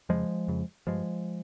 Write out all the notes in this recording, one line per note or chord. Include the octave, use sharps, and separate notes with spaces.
F2 C#3 F3 G#3
F2 C#3
G2 F3 G#3